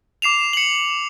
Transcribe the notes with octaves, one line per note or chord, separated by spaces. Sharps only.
D6 C7 E7 F7
C#7 F#7